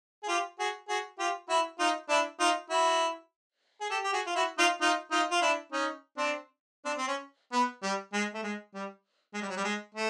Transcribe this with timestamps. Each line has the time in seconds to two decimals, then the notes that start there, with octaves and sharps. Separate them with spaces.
0.23 G#4
0.28 F4 G4
0.59 F#4 G#4
0.88 F#4 G#4
1.19 F4 G4
1.49 E4 F#4
1.79 D#4 F4
2.09 D4 E4
2.40 D#4 F4
2.70 E4 F#4
3.81 G#4
3.90 G4 A4
4.04 G4
4.13 F#4 G#4
4.26 F4
4.35 E4 F#4
4.58 D#4 F4
4.81 D#4 F4
5.11 D#4 F4
5.31 F4
5.42 D4 E4
5.72 C#4 D#4
6.17 C4 D4
6.85 C4 D4
6.97 C4
7.08 C#4
7.52 B3
7.83 G3
8.13 G#3
8.34 A3
8.43 G#3
8.74 G3
9.34 G#3
9.42 G3
9.49 F#3
9.57 G3
9.64 G#3
9.95 A3